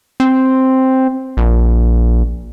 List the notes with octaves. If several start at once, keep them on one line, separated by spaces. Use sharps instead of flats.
C4
A#1